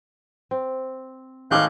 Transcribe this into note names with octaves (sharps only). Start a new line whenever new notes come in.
C4
G#1 G#3 A4 C#5 F5 D6 F#6 G6